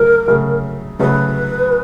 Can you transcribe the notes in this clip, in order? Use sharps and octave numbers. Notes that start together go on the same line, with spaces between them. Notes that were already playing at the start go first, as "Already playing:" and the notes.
Already playing: C#3 F#3 A3 A#4
C#3 F#3 A3
C#3 F#3 A3 B4